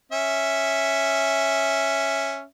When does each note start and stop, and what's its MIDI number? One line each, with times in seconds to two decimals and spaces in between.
0.12 2.44 61
0.12 2.44 76